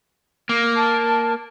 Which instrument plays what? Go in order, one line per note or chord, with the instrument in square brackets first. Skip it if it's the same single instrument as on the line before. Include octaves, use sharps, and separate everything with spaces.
[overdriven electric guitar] A#3
[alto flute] A5